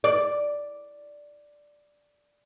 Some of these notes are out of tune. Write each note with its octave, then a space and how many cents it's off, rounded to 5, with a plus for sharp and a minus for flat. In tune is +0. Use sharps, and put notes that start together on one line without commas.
D5 +0